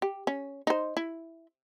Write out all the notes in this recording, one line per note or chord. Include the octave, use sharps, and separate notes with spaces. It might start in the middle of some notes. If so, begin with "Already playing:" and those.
G4
C#4
D#4 C5
E4